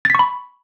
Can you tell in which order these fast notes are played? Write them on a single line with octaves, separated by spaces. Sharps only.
A6 B6 C#6 B5